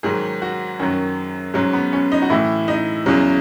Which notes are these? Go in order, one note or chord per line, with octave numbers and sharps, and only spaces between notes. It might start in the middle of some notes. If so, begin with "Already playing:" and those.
G#2 D#3 F#3 G#4
F#4
F#2 D#3 F#3 C#4
G#2 F#3 C#4
B3
C#4
D#4
F#4
A2 E3 E4
D#4
E2 C#3 F#3